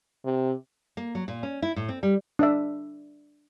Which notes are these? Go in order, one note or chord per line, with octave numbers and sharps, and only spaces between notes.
C3
A#3
F#3
A#2
C#4
E4
A2
C4
G3
D4 D5 E5